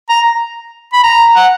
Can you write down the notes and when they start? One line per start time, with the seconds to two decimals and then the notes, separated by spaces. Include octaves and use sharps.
0.09 A#5
0.93 B5
1.04 A#5
1.36 F#5